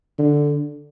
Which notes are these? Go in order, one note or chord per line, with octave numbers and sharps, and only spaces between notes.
D3